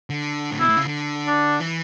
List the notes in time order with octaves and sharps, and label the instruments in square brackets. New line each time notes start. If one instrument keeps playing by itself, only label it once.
[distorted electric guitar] D3
A2
[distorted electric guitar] B2 [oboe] E4
[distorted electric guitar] A2
C#3
D3
[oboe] D4
[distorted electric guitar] E3